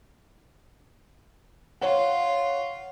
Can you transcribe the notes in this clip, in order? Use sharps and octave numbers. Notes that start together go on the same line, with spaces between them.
F4 C#5 F#5